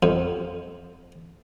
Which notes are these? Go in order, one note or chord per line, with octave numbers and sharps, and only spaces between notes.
F2